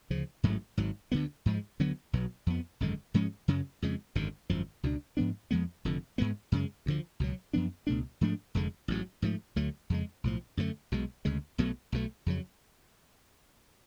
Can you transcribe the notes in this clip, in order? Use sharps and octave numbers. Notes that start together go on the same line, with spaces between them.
D2 C#3 F3
A1 G#2 F#3 A3
G#1 G#2 F#3
D2 D3 G#3 B3
G#2 F3 G#3
D2 D3 F#3 B3
B1 B2 F#3 B3
F2 F3 B3
G#1 F#2 D3 G#3
G#2 F3 G#3 C#4
F#2 C#3 F#3
F2 C#3 G#3
G#1 F#2 D3
G#1 F#2 F3
C#2 B2 G#3 D4
G#2 F3 B3 D4
F2 F3 G#3 B3
F1 F2 D3
G#2 G#3 B3
F#2 C#3 G#3
D2 D3 F3
C#2 B2 F#3
F#2 F3 B3 D4
C#2 B2 A3 D4
G#2 F3 A3 D4
F1 F2 D3 G#3
A1 G#2 F#3
G#2 F3 A3
D2 D3 F#3 A3
F2 C#3 G#3
B1 A2 F3
F#2 D3 F3 A3
B1 B2 G#3
D2 C#3 G#3
B1 B2 F#3 A3
B1 B2 A3
F2 C#3 F#3